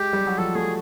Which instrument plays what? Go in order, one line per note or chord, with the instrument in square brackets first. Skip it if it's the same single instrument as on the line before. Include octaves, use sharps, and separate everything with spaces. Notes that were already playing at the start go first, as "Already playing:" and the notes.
Already playing: [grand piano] G#3 [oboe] G4
[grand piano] G3
F#3
[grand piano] F3 [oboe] A4
[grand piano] A3 [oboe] G#4